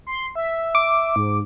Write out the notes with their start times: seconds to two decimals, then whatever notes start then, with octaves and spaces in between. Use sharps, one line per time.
0.07 C6
0.35 E5
0.75 D6
1.16 G#2